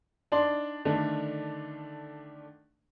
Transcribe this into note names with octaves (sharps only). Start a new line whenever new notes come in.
D4 D#4 D5 C6
D3 D#3 A3 D4